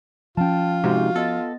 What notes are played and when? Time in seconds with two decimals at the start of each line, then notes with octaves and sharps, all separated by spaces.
0.37 F3 C#4 F4 G5 A5
0.84 G#2 C3 F#4
1.16 B3 A4 D#5 A6